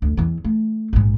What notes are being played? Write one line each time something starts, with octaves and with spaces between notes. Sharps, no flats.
D2
E2 E3
A3
A#1 G#2